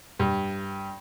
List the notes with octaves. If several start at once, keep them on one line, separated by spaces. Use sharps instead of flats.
G2